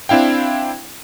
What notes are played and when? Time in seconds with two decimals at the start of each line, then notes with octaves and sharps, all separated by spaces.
0.09 C4 D4 E4 F5 G5